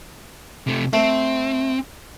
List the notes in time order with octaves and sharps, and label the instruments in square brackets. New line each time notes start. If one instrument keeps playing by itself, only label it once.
[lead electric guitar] C3 A3
[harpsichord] A3 [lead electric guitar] C4